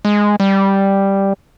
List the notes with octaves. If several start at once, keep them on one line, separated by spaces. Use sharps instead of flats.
G#3
G3